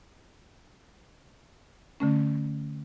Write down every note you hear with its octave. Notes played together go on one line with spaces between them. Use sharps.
D3 A3 C#4